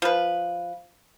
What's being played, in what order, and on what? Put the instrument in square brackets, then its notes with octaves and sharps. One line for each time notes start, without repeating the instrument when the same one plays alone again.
[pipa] F3 B4